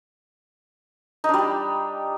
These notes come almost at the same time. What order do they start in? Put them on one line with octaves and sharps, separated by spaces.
D#4 D4 G3 G4